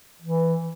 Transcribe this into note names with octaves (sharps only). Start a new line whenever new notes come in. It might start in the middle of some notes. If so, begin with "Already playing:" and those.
E3